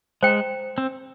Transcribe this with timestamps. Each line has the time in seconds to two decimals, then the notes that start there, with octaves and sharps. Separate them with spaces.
0.23 G#3 C5 G5 A#5
0.78 C4